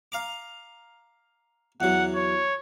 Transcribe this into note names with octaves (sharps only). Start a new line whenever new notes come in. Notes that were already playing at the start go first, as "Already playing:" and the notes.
F5 A#5 D6
E2 F#3 F#5
C#5